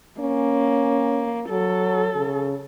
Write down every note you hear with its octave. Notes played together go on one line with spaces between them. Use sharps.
A#3 C#4
F#3 A4
C#3